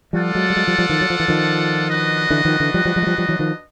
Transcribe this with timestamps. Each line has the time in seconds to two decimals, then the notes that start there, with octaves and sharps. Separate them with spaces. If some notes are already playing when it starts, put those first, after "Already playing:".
0.13 F3 G3 F4 A4 D5 F#5
0.35 F#3 G#3
0.50 G3
0.56 F#3 G#3
0.67 F3 G3
0.78 F3 G3
0.89 D#3 F3
1.01 F#3
1.10 F3
1.20 E3
1.28 D#3 F3
1.88 D4 F#4 B4 D#5
2.30 D3 E3
2.45 D#3 F3
2.60 D3 E3
2.74 F3 G3
2.85 F3 G3
2.96 F3 G3
3.03 G#3
3.07 F3 G3
3.18 F3 G3
3.29 E3 F#3
3.39 D#3 F3